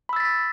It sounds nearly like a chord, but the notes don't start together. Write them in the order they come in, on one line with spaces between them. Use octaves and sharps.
B5 E6 A6 B6